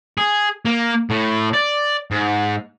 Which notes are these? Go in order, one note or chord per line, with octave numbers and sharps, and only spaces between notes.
G#4
A#3
A2
D5
G#2